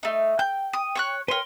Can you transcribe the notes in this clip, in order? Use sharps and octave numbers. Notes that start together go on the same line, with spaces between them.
A3 D#4
G5 G6
D#6
C#5 C#6 F#6
A#4 B4 C#5 G5 C6